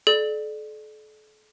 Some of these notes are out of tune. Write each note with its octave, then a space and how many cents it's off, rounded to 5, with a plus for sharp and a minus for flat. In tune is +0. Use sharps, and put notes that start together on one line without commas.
A4 -40 D5 +20